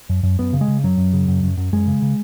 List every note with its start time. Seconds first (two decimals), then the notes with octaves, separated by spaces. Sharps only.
0.09 F#2
0.23 F#2
0.39 F#2 B3
0.53 C#3
0.61 G#3
0.68 C#3
0.84 F#2 F#3
0.98 F#2
1.13 C#3
1.28 F#2
1.43 F#2
1.57 F#2
1.72 F#2 G#3
1.87 C#3
2.02 C#3